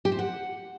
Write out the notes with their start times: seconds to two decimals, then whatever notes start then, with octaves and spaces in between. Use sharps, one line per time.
0.05 G4
0.12 C5
0.19 F#5